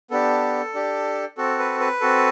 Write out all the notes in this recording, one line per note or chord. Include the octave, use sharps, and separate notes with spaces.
B3 D4 G4 A4
D4 G4
C4 F#4 A4
B4
B4
C4 F#4 A4